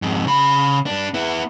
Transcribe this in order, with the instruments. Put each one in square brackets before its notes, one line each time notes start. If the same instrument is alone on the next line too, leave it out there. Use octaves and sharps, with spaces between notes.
[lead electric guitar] F2 G#2
C#3 B5
G2 D4
B3 E4